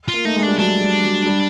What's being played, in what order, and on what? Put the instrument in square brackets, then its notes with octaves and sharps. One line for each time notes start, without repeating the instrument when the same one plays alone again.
[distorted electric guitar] F4
[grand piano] A#3
[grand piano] A3 [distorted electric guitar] D#4
[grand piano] G#3
[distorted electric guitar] D4
[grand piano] G3
[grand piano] F#3 [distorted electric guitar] D4
[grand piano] G3
F#3
G3